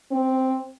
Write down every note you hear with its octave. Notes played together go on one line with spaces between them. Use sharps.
C4